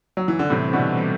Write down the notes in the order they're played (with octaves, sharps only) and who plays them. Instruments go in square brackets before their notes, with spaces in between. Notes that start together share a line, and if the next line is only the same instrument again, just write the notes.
[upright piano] F#3
E3
D3
[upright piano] A2 C3 [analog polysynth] E3 G3 C4
[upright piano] B2 D3
[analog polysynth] E3 G3 C4